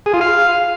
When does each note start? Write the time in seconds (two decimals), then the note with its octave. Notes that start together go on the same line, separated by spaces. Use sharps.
0.06 G#4
0.14 F4
0.21 F5